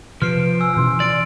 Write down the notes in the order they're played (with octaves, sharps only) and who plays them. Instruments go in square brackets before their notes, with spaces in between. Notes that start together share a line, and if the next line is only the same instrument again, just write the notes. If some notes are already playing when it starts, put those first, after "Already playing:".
[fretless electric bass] C3 [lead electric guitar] F3 [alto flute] B4 [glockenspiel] F6 C7 D7
[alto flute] G#5 [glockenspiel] E6
[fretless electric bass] B2 E3 C#4 [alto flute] C6
[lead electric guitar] D5 [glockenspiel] A6 D7